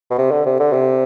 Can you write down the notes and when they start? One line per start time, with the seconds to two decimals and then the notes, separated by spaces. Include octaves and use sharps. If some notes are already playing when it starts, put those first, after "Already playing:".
0.11 B2
0.18 C3
0.31 D3
0.46 C3
0.60 D3
0.73 C3